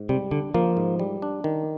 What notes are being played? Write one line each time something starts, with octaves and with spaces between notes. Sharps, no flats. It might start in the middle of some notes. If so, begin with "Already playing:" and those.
Already playing: G#2
C3 G3
D3 D4
F3 A#3
G#2
G3
D4
D#3